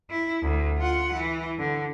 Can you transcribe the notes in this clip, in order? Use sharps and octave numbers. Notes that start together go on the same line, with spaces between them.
E4
D2
F4 F#5
E3
D3